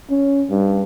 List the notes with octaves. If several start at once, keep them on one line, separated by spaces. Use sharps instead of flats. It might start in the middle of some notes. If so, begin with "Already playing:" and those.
C#4
G2